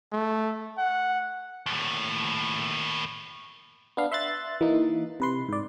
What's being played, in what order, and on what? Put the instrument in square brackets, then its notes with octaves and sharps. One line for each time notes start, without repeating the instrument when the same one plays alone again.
[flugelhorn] A3
F#5
[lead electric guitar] D#2 A2
[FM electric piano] B3 D4 F5
E5 C6 F#6 A6
E3 A#3 D#4
C3 B4 C6
G#2 D5